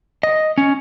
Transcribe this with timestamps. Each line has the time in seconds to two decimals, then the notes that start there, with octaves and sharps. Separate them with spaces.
0.23 D#5
0.58 C#4